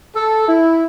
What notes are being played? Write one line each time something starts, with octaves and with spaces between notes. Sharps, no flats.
A4
E4